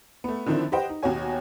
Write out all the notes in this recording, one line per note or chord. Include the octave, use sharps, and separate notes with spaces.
A3 B3
D3 D#3 F3 C4 D4 E4
G4 B4 C5 D#5 F#5 G5
D#4
D#2 B2 F#4 C#5 G#5